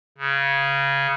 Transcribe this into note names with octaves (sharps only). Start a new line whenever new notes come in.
C#3